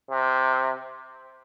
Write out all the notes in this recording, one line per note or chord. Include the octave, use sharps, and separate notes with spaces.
C3